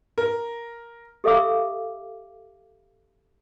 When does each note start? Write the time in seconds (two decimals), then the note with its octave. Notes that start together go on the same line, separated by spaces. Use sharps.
0.18 A#4
1.24 G4 A4 E5 F5 D6 E6